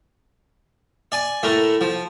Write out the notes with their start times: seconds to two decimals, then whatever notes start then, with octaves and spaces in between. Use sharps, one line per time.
1.12 D5 G#5
1.43 A2 A3 A#4
1.81 F3